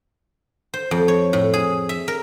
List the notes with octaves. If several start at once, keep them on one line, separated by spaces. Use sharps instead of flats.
C5
F2
C#5
A2
G#4
E5
A#4